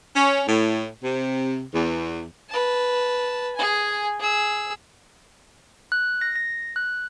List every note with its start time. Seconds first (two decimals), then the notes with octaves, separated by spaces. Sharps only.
0.16 C#4
0.48 A2
1.04 C3
1.74 E2
2.50 B4 A5
3.55 G#4 G#5
4.19 G#4 E6
5.92 F#6
6.21 A#6
6.36 A#6
6.76 F#6